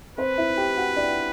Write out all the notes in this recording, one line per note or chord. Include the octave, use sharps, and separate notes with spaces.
C4 B4 C5
E4 E5
G4 G5
F#4 F#5
D4 D5